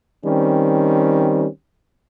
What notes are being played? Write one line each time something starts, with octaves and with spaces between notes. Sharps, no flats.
D#3 G3 C4 C#4